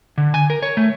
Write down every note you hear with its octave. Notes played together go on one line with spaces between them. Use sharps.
D3
G#5
A#4
C#5
A3